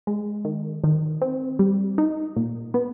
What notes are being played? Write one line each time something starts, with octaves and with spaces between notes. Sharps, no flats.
G#3
D#3
D#3
C4
G3
D#4
A#2
B3